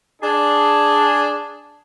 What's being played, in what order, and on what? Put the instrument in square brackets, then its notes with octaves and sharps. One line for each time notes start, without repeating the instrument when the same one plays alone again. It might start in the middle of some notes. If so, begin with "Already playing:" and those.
[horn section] D4 G#4